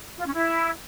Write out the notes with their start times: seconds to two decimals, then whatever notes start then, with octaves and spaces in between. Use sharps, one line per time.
0.19 F4
0.26 C#4
0.34 E4